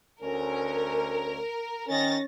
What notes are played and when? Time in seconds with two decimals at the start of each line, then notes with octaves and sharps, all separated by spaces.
0.22 D2 C#4 A#4
1.90 D#3 C#4 D#4 A6 A#6